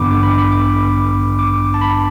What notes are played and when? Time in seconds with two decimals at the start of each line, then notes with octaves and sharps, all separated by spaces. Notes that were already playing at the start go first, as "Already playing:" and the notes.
Already playing: A1 G2 D3 B3 D4 B5 D6
0.11 D6
0.23 B5
0.31 D6
0.38 B5
0.52 D6
1.39 D6
1.74 A5
1.81 B5